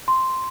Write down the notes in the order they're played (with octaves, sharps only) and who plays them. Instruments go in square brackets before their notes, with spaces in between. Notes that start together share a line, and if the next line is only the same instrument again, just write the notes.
[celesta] C6